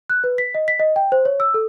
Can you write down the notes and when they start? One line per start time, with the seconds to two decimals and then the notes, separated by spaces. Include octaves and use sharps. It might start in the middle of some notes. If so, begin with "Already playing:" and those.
0.10 F#6
0.24 B4
0.38 B6
0.54 D#5
0.68 B6
0.79 D#5
0.96 G5
1.12 C5
1.25 C#5
1.40 E6
1.54 A4